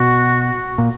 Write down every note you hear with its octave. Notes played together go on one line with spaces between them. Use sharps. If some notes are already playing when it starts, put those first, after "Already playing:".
Already playing: B2 F#4
A#2